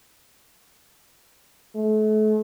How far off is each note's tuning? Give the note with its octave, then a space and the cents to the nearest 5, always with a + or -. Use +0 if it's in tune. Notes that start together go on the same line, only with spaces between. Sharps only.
A3 -35